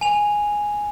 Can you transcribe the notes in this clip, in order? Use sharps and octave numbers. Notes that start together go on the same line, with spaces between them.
G#5 F7